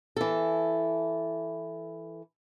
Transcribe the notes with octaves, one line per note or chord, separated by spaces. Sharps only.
E3 A4